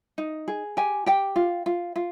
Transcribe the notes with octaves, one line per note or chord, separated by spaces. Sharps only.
D#4
G#4
G4 G#5
G4 G5
F4
F4
F4